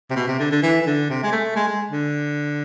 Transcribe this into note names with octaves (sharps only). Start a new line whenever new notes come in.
C3
B2
C3
D3
D3
E3
E3
D3
C3
G#3
A3
G#3
G#3
D3